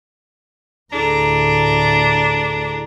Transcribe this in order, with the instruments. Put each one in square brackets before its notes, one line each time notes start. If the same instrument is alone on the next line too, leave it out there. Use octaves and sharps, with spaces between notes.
[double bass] D2 A2 [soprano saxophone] D4 [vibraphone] E4 G#4 A4 [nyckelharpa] A#5